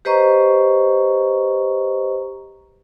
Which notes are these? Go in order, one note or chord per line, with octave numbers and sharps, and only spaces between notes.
G4 B4 C5 D#5 A#5 C#6